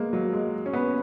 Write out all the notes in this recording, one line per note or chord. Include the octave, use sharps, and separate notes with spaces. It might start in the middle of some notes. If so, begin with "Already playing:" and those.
Already playing: G#3 A#3 B3
F#3
G#3
C#4
B3